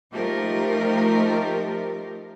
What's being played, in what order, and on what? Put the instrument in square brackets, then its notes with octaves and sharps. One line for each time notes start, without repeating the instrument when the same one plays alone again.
[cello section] F3 A3 D#4 G4 A#4